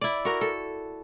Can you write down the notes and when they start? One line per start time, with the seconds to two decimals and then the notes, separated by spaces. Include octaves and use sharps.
0.01 E4 D5
0.25 F#4 A#4
0.41 A4